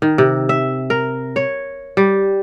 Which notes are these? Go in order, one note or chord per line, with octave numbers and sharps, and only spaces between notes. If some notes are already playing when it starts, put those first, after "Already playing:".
D#3
C3
E5
A#4
C#5
G3